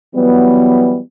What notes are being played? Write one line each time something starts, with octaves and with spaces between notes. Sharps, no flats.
E3 F#3 G3 B3